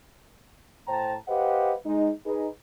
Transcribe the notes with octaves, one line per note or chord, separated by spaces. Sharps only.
A2 C5 G5 A5 A#5
G4 B4 C5 D#5 F5 F#5
G#3 D#4
D#4 G#4 B4